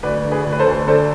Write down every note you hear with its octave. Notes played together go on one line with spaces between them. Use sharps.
D2 B4 D5
D3
G#4 B4
D2
B4
A4 C5
D2
D3 A4 C5